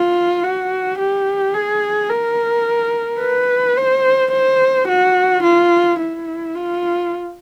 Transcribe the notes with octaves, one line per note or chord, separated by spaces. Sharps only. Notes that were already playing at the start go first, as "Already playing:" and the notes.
Already playing: F4
F#4
G4
G#4
A#4
B4
C5
C5
F#4
F4
E4
F4